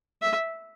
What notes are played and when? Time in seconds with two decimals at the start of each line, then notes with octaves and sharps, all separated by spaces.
0.22 E5